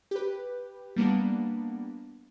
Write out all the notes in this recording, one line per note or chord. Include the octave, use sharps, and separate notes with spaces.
G4 B4
G3 A#3 B3 D4